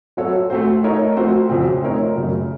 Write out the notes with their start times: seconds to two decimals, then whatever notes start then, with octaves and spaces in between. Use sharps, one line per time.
0.17 F#3 C4 F#4 A4 C#5
0.50 A3 C4 F#4 C5
0.84 A3 D#4 A#4 C#5
1.17 F3 A3 C4 F#4 C5
1.49 F2 C#3 F3 C4 F#4
1.83 A3 C4 D#4 A#4 C#5
2.16 F#2 C#3 F#3 A3